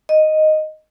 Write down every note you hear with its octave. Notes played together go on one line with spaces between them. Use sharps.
D#5